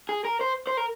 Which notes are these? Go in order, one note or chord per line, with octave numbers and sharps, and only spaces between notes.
G#4
A#4
C5
C5
A#4